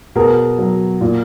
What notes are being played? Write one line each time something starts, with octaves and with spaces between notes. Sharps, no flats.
B2 G#4 A#4
F#3
A#2